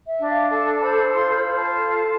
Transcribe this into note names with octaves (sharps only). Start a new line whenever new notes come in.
E5
D4
F5
A4 A5
C5 B5
F4 C6
B5
F4
A5
A4